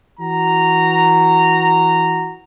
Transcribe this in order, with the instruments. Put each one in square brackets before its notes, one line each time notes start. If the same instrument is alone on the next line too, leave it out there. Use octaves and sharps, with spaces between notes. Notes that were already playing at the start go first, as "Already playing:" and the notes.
[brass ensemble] E3 F#4 A#5